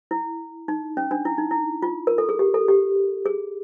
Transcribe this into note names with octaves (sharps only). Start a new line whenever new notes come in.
E4
D#4
C#4
D4
E4
D#4
E4
F4
A#4
A4
G#4
G4
A4
G4
G#4